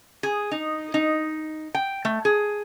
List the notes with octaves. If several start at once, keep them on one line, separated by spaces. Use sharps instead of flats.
G#4
D#4
D#4
G5
A3
G#4